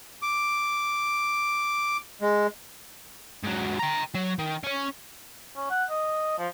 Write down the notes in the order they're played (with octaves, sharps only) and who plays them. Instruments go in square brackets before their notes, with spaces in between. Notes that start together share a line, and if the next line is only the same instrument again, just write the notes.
[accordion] D6
G#3
[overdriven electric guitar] G#2 F#3
G5 A#5
F#3
D#3
C#4 C#5
[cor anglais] C#4
F#5
D#5
F3